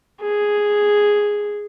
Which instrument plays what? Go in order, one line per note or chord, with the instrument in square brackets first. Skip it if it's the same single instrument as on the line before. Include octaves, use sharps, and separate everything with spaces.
[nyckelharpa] G#4